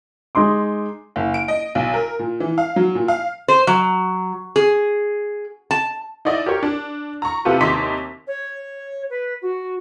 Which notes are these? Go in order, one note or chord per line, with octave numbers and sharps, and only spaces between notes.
G#3 D#4 C6 D6
F#1
D7
D#5
B1
A#4
A#2
E3
F5
F#3
A#2
F5
C5
F#3
G#4
A5
D#4 E4 D5 D#5
G4 A#4 C#5
D4
A#5 C#6
C3 F4 G4 A4 B4
D#2 C3 D#4 C6 D6 B6
C#5
B4
F#4